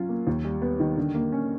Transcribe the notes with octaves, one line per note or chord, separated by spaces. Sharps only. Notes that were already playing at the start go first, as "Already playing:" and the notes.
Already playing: F#3 C#4 F4
A#3
D#2
G3
B3
D#3
D3
A#3
C#4